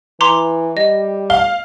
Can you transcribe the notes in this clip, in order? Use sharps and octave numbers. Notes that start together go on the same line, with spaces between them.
E3 A#5 C6 D6
G3 D#5
F5 G7